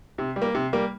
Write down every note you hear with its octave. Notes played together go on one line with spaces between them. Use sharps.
C3
G3
A#3
C3
G3 A#3